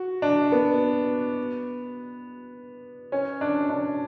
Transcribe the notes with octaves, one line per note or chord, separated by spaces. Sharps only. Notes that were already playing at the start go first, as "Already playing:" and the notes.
Already playing: F#4
D4
B3
C#4
D4
D4